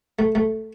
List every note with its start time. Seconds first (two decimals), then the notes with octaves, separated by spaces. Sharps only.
0.19 A3
0.35 A3